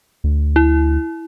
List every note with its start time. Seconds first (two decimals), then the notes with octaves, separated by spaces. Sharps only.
0.24 D2
0.56 E4